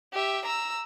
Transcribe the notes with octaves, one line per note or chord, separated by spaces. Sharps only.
G4 E5
A#5 E6